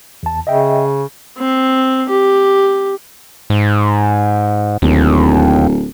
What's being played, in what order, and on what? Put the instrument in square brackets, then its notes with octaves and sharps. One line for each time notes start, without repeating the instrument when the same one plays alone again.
[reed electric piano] E2 A5
[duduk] C#3 [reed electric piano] D#5 E5 G5
[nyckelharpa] C4
G4
[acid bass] G#2
[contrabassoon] D1 [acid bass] D#2